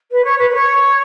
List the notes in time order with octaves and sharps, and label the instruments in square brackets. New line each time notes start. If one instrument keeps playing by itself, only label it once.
[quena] B4
C#5
B4
B4
C#5